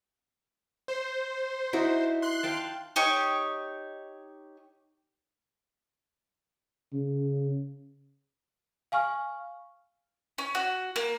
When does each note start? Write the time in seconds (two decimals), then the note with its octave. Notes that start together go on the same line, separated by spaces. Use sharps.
0.88 C5
1.73 D#4 E4 F#4
2.22 C6 F#6
2.43 F5 G5 A5
2.96 D#4 G4 C#5 C#6
6.93 C#3
8.92 F5 G#5 C#6 F6
10.38 C#4
10.55 F#4
10.96 A#3